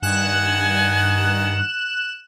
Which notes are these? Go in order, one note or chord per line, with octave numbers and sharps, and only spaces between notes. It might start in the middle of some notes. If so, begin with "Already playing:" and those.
G2 D#3 F#5 G#5 F#6 E7